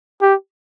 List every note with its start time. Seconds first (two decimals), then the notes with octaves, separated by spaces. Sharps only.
0.22 G4